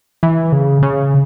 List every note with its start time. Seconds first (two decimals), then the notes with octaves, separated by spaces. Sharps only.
0.23 E3
0.52 C#3
0.83 C#3